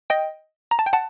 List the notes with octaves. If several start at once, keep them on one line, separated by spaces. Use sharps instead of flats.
D#5 G5
A#5
A5
G5
F#5 A5